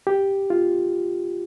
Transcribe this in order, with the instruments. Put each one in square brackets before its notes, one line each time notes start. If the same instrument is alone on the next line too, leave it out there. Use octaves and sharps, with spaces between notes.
[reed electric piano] G4
F4